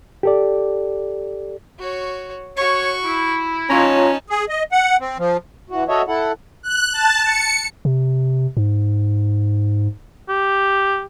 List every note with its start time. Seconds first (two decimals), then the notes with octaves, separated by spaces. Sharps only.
0.23 G4 A4 D5
1.79 F#4 C#5
2.57 F#4 C#5 C#6
3.04 E4
3.70 C#4 D#4 F4 C#5 A5 A#5
4.30 G#4
4.49 D#5
4.72 F#5
5.00 C4
5.18 F3
5.70 E3 F#4
5.88 F#4 A4 C#5 D#5 E5
6.08 E4 A4 F#5
6.62 F#6
6.92 A5
7.24 C#7
7.85 C3
8.57 G#2
10.29 G4